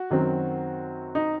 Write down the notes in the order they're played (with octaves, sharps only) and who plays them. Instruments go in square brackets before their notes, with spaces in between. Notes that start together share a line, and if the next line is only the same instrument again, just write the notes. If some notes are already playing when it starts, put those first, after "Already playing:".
Already playing: [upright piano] F#4
F#2 D#3 F#3 C4
D#4